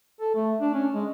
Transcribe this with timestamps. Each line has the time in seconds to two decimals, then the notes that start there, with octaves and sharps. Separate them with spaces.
0.21 A4
0.35 A3
0.61 D4
0.74 C#4
0.95 G#3